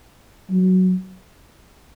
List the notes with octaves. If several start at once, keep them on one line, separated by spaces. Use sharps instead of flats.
F#3